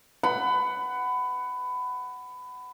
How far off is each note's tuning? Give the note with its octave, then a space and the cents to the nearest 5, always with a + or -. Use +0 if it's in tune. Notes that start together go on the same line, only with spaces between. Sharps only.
F#5 +10 B5 +20